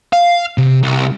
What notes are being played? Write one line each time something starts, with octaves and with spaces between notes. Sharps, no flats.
F5
C3
C2